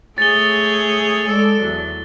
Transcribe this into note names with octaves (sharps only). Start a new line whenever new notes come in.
A3 G#4 C#5 A6 G7
G#3 A4 D5
E2 F#3